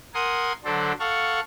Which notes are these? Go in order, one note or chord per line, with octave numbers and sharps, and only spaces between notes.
A#4 F#5 G#5 C6 D#6
D3 F#3 D4 A4 C5
A4 F5 F#5 C#6